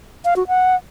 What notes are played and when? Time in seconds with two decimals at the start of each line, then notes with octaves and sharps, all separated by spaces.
0.25 F5
0.36 F#4
0.48 F#5